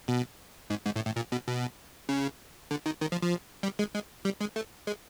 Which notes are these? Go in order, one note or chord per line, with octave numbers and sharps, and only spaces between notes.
B2
G#2
G#2
A2
A2
A#2
B2
B2
C#3
D3
D#3
D#3
F3
F3
G3
G#3
G#3
G3
G#3
A3
G#3